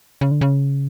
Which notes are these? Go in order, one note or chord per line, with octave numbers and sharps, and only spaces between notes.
C#3
D3
C#3